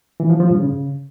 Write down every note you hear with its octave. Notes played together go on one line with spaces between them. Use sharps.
E3
F3
F3
G2
C#3